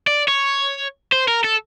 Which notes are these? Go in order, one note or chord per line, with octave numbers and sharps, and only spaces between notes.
D5
C#5
C5
A#4
A4